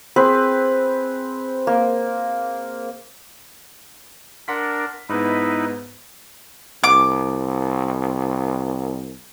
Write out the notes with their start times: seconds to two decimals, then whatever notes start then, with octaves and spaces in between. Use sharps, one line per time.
0.16 C4 G#4 B4
1.67 A#3
4.48 D4 A#4 F#5 C6 B6
5.09 G#2 B3 D#4 E4 B4
6.84 C2 D6